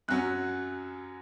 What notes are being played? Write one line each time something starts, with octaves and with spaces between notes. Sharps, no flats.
F#2 F#3 C#4 F#6